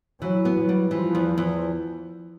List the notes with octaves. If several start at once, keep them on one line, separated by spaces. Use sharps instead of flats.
E3 F#3
B3
F#3
G3
E3 F3
E2
E2